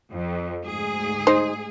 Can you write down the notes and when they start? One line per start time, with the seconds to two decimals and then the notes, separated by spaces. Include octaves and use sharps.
0.12 F2
0.67 D2 G#2 G#4
1.27 D#4 C5